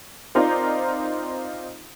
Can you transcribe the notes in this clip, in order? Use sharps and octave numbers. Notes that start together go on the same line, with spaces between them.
C4 D#4 F4 A#4 C5 D5